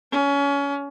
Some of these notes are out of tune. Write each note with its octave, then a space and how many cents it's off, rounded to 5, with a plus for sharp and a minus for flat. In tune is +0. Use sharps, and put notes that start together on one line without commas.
C#4 +25